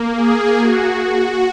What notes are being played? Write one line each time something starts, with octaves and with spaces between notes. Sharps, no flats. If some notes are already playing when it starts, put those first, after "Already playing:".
Already playing: A#3
G#4
F#4